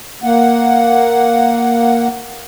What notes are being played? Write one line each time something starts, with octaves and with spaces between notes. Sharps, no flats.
A#3 F#5